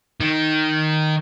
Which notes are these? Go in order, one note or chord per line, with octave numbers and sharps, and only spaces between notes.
D#3